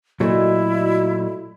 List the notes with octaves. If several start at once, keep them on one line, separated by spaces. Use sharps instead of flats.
A#2 F#3 A3 E4 F#4 D5 D#5